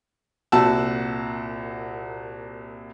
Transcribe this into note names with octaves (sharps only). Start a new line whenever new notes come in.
C2 A#2 F#4 F#5 A5 E6